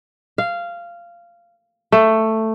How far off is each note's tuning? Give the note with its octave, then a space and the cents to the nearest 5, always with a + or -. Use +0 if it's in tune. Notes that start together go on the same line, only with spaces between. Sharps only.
F5 -15
A3 +10